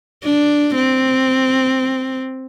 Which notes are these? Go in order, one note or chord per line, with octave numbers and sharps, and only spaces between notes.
D4
C4